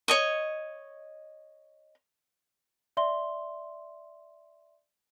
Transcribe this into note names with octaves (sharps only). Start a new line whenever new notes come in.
C#5 D#5 C#6
D5 E5 C6 G7